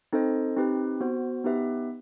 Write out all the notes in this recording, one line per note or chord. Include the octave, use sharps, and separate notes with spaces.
C4 D#4 A4 C5 D#5
C4 D#4 G4 B4
B3 F#4 C5
B3 D#4 G4 B4 E5